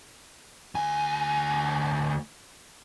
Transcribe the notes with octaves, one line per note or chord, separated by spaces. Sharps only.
D2 G#5